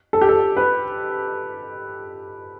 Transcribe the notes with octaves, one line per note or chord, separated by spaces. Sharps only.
A4
G4
A4
B4